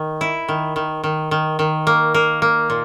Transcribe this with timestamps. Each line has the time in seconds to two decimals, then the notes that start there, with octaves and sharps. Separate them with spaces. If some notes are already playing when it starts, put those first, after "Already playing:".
Already playing: D#3
0.21 E4
0.48 D#3
0.76 D#3
1.04 D#3
1.31 D#3
1.59 D#3
1.87 A#3
2.14 A#3
2.42 A#3
2.70 A#2